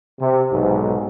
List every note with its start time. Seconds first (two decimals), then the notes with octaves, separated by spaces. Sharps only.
0.20 C3
0.50 B1 G#2